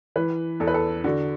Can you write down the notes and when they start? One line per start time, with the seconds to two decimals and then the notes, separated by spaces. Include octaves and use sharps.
0.16 E3 B4
0.60 E2 A4
0.67 B4
0.74 A4
1.04 D3 F#4